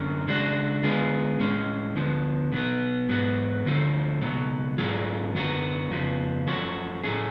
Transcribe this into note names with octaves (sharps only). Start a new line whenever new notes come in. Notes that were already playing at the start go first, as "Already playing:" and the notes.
Already playing: F#2 D3 F#3 C#4
C#3 G#3 D4 F#4
D3 G#3 B3 F4 G#4
A2 G#3 C#4
D2 D3 F3 B3
B2 F#3 B3
G#2 F#3 B3 F#4
D2 D3 F3 A3
C#2 B2 F#3
G#2 F#3 A3 F4 G#4
F#2 D3 F#3 B3 F#4
F2 C#3 F3 B3
F#2 F3 A3 C#4 F#4
A2 F#3 A3 C#4 G#4